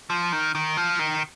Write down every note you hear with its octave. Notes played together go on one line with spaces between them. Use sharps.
F3
D#3
D#3
F3
D#3